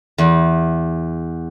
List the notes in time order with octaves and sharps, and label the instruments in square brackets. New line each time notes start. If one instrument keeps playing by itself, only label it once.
[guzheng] E2